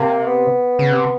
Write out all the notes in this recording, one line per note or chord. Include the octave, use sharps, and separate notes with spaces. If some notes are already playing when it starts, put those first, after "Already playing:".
Already playing: C3 A#3
B3
C#3
C3